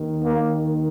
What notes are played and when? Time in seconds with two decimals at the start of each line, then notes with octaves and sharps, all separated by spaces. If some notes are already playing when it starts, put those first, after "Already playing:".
Already playing: D#2 D#3
0.24 A#3